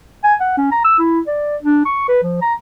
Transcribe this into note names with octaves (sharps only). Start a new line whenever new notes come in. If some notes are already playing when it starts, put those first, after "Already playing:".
G#5
F#5
C#4
A#5
E6
E4
D5
D4
C#6
B4
F3
A#5